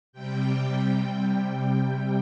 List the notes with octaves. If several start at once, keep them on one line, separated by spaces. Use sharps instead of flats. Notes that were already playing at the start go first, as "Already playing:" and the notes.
C3 G3 G5
G5